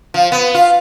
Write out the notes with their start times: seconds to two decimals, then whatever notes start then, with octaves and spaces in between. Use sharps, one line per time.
0.14 F3
0.32 B3
0.54 F4